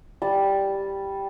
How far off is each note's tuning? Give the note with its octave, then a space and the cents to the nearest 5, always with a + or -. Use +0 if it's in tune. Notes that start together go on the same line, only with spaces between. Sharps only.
G3 +0 A5 +0